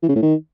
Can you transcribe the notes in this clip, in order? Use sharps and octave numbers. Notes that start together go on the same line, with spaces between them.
E3
C#3
A2
D#3